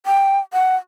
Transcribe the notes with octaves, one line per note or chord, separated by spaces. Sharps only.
G5
F#5